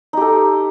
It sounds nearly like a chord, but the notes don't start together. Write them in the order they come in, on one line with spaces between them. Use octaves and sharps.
D#4 G4 A4